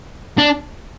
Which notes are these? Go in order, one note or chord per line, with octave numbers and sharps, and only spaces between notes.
D4